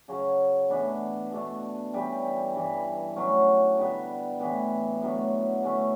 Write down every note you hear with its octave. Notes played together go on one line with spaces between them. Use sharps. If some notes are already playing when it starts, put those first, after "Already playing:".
C#3 F#3 C#4 F#4
A2 E3 B3 D4
B2 A3 D4
E3 G3 C#4
G2 E3 G3
A2 F#3 C#4 F#4
D3 G3 B3
A2 E3 B3
A2 F#3 B3 D4
D3 A3 C#4 E4